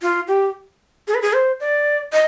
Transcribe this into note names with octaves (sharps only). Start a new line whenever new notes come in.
F4
G4
G#4
B4
G#4
C5
D5
D#5